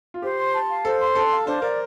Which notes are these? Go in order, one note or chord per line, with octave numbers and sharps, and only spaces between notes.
F4
G4 C5
C6
A5
F5
A4 C5
C6
A4 A5
F5
D4 C5
A#4 D5